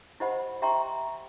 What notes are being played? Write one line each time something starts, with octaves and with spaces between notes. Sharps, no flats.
E4 G4 C5 D#5 F#5 B5
G4 E5 G5 A#5 C6 C#6